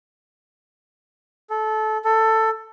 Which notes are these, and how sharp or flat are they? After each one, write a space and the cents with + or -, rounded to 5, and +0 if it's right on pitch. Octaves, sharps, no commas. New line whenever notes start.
A4 -20
A4 +15